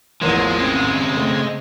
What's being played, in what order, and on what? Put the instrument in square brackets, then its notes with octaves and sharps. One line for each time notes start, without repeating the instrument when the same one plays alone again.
[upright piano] A1 E2 A#3 [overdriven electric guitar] F3 [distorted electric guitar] G#3
[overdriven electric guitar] C#3 C4
[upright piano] A3